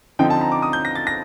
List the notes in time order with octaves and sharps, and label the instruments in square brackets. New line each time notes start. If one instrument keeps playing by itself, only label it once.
[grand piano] D3 F3 C4 D#4 G5
A5
A#5
D6
D#6
G6
A#6
A6
A#6